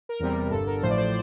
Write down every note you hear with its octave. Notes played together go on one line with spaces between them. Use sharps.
A#4
E2 C3 G3 A#4
G1 G2 D3 A4
A#4
A1 A2 F3 C5
D5
C5